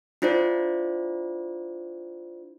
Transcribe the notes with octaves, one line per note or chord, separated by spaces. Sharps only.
D4 E4 F4 C5 D5